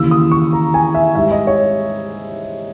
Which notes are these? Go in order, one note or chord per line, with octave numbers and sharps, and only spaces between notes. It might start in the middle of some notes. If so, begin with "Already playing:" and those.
Already playing: D#2 C#3 E3 E6
D#6
C#6
A#5
G#5
E5
G#2 G3 E5
D#5
C#5